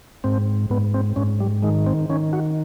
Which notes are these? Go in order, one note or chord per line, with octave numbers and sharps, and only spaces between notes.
G#2 C4
G#2 B3
C4
G#2 C#4
G3
D#3 G#3
C4
D#3 C#4
F#4